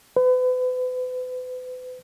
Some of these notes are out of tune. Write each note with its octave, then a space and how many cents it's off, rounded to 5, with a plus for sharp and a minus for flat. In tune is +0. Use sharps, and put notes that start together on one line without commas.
B4 +40